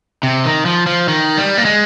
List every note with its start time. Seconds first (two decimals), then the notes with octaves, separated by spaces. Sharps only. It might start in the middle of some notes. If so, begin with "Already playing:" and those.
0.23 C3
0.45 D#3
0.66 F3
0.87 F3
1.08 D#3
1.37 G3
1.58 A#3
1.65 G#3